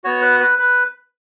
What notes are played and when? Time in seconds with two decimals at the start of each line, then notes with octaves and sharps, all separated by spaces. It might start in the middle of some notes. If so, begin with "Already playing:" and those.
0.04 B3 F#4 C#5
0.22 B4
0.40 B4
0.59 B4